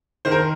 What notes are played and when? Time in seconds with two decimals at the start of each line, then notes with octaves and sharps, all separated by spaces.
0.25 D#3 C5
0.32 A#4